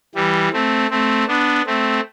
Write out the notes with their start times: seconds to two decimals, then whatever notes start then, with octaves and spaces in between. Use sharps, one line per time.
0.15 E3 G3
0.53 A3 C4
0.90 A3 C4
1.28 B3 D4
1.66 A3 C4